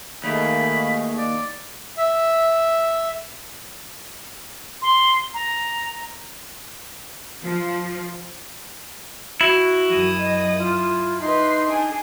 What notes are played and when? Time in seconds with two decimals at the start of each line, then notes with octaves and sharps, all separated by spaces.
0.24 D#2 D#3 A3 G#4 B5
1.18 D5
1.98 E5
4.82 C6
5.34 A#5
7.42 F3
9.41 E4 F#4
9.89 F#2 D#6
10.18 D#5
10.58 F4
11.20 D#4 B4 C6
11.67 D4 G#4